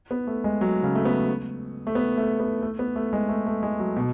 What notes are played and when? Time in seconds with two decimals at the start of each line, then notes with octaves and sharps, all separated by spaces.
0.11 B3
0.27 A3
0.44 G#3
0.61 F#3
0.83 C#3
0.95 A3
1.05 B3
1.87 A3
1.95 B3
2.17 A3
2.40 B3
2.62 A3
2.79 B3
2.96 A3
3.13 G#3
3.29 A3
3.47 A3
3.63 G#3
3.79 F#3
3.96 B2